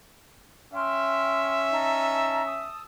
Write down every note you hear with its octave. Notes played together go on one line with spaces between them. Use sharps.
C#4 E5 G5 C6 F6
D#4 A5 A#5
A5 D#6 E6